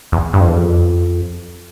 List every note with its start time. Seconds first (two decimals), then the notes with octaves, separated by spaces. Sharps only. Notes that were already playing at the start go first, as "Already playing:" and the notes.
0.12 E2
0.33 G2
0.40 F2
0.48 E2
0.56 F2